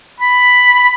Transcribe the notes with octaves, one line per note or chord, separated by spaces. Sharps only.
B5